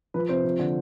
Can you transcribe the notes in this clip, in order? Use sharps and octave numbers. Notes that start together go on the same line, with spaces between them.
F3 B4
C3 C5
F3
D3